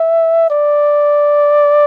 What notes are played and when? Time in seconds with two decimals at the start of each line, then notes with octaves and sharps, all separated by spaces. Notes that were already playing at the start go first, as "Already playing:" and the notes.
Already playing: E5
0.50 D5